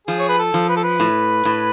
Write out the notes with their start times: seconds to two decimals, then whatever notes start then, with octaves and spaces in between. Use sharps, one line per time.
0.07 F3 G#4
0.19 C#5
0.29 B4
0.38 A4
0.54 F3
0.69 B4
0.76 A4
0.84 B4
1.00 A2
1.45 A2